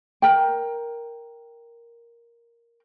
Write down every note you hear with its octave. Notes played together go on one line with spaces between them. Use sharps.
A#4 G5